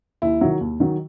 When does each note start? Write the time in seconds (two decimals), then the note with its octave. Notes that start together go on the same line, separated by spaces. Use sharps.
0.22 D#2 E4
0.41 D#3 F#3
0.61 D#2
0.80 D#3 F#3